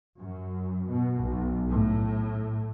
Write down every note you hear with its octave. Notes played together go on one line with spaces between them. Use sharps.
F#2
B2
B1
A2